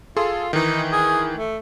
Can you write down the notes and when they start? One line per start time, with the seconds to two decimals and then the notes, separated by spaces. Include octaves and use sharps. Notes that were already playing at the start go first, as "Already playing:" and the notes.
0.17 F4 G#4 A4 C6
0.53 D#3 E3 D#4
0.92 G#4
1.36 A3